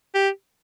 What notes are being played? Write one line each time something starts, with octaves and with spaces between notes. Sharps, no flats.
G4